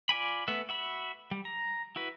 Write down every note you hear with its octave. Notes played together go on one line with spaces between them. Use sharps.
F4 D5 G#5 B5
A3 B3 B4 E5
F#4 E5 B5
G3
A#5
E4 F#4 B4